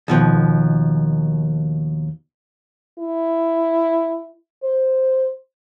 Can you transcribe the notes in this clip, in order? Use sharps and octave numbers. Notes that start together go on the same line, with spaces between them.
D#2 B2 F3
E4
C5